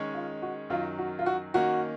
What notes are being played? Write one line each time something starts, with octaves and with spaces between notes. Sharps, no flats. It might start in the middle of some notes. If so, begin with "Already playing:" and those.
Already playing: D#3 G#3 C#4
F4
F#4
F#2 D#3 F#3 F4
F#4
F4
F#4
D#3 A#3 C#4 F#4